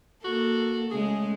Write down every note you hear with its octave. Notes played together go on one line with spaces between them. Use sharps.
A#3 F#4 A4
C#3 G#3 A3 G#4